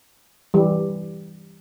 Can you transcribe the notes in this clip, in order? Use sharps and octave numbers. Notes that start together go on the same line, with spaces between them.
E3 G3